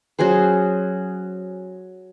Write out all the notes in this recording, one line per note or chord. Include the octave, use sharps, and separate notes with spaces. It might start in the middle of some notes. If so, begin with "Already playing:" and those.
F#3 C#4 G#4 C5